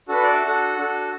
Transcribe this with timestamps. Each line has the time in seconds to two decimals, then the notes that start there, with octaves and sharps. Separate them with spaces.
0.09 D4 F#4 A4 B4
0.23 D5
0.33 E5
0.43 D4 F#4 A4 F#5
0.78 D4 F#4 A4